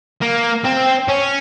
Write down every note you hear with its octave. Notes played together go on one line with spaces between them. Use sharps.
A#3
C4
C#4